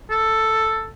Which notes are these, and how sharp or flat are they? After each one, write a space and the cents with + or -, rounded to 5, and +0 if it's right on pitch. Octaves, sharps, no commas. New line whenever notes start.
A4 +5